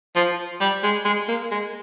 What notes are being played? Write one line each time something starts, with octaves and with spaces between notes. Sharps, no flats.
F3
G3
G#3
G#3
A#3
G#3